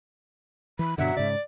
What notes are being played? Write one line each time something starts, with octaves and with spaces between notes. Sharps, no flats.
E3 B5
G2 B2 D3 F#3 E5 F#5
G#2 C#3 D5